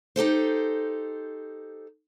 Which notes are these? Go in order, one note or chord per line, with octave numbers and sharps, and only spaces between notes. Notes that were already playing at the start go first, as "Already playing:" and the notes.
D#4 G4 A4 C5